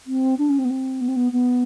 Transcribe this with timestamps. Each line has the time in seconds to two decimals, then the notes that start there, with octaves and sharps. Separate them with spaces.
0.06 C4
0.38 D4
0.49 C#4
0.58 C4
0.64 B3
0.69 C4
1.00 B3
1.08 C4
1.16 B3
1.32 B3